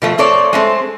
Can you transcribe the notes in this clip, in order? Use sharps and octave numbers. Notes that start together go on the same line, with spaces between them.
B2 F3 A3
A3 C4 A4 C#5 D5
G#3 A3 C4